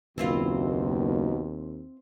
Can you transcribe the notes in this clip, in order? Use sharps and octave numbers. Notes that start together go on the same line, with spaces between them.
F#1 D#2 B2 D#3 C4 E4 F4